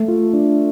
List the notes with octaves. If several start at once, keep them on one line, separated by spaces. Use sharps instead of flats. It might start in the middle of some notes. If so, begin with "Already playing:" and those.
Already playing: A3
F4
D4